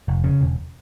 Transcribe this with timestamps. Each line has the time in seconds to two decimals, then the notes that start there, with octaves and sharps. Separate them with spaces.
0.08 F1
0.24 C#3
0.41 E1